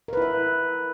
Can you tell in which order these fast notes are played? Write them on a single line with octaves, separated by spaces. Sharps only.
A#4 B4 E4 E5